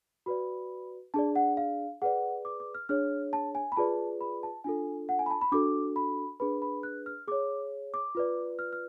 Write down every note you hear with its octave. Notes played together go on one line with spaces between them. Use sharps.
F#4 B4 D5 B5
D4 G#4 D5 A5
F#5
F5
G#4 B4 D5 F#5
D6
D6
F6
D4 G#4 C#5 F6
A5
G#5
B5
F4 G#4 B4 D5 A5
B5
A5
D4 F4 A4 G#5
F#5
G#5
B5
A5
B5
D4 F#4 A4 D6
B5
D4 G#4 B4 B5
B5
F#6
F6
G#4 C#5 D6
D6
F4 B4 D5
F6
F6